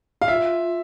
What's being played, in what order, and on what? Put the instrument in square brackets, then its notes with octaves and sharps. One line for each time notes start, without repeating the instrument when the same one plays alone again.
[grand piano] F5
[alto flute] F4 [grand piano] E5